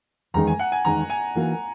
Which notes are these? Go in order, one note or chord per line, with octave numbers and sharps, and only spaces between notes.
E2 D#3 G#3 D#4 A#5
G#5
F#5
G#5
E2 D#3 G#3 D#4 A#5
G#5
E3 A#3 D#4 F#4